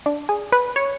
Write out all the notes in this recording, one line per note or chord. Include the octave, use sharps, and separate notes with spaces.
D4
G#4
B4
C#5